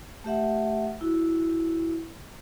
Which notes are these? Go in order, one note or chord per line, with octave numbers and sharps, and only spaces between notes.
A3 G4 E5 F#5
E4 F#4